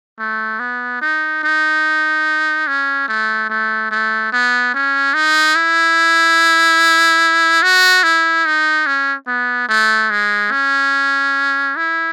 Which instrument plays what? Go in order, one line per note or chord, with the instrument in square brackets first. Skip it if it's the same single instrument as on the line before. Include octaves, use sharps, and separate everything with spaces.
[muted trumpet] A3
B3
D#4
D#4
C#4
A3
A3
A3
B3
C#4
D#4
E4
F#4
E4
D#4
C#4
B3
A3
G#3
C#4
E4